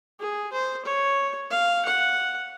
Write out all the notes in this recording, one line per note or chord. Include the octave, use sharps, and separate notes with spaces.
G#4
C5
C#5
F5
F#5